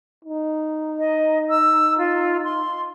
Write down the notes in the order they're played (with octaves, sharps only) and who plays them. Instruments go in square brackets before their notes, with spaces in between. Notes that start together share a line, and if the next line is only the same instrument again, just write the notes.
[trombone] D#4
[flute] D#5
E6
F4
C6